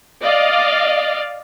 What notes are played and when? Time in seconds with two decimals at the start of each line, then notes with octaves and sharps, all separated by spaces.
0.22 D5 D#5 F5